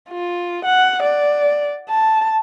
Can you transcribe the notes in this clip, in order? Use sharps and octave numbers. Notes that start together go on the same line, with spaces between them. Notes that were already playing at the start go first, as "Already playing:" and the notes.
F4
F#5
D5
A5